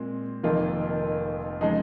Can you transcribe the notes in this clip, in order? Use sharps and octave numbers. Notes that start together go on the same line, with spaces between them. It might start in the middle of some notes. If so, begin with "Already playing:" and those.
Already playing: A#2 G#3 C4
F1 F2 D#3 A#3 F4
C#3 F3 G#3 D#4